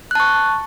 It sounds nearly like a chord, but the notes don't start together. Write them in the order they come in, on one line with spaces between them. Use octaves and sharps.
F#6 A5 C#6